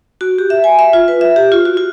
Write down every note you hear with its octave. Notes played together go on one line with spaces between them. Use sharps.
F#4
G4
E5
G#5
E5
F4
B4
E5
G4
F4
F#4
F4